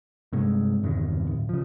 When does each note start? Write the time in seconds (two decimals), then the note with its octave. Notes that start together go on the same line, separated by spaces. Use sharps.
0.33 G2 C3 G#3
0.83 G1 E2 C3 D#3
1.27 D1
1.49 C#3 F3